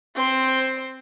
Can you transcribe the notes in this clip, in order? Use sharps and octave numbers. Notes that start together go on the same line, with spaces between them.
C4 C5